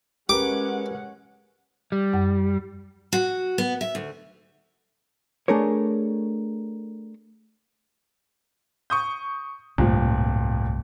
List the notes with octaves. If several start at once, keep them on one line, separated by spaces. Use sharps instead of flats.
G#3 C#4 G4 A#4 B4 F#5 D6
G3
F#2
F#4
B3
E5
D2
A3 D4 G#4 A#4 C#5
C#6 D#6 G6
D1 C2 G2 A#2 F3 A3